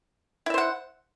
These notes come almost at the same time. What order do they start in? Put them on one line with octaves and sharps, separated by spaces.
E4 E5 C5 F#5